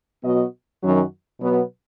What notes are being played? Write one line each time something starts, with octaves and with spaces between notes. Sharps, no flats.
B2 F#3 B3 F#4 D#5
F#2 D#3 F#3 C#4 F#4
B2 F#3 B3